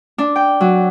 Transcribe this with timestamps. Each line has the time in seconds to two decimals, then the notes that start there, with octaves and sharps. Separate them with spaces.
0.18 D4
0.36 G5
0.61 F#3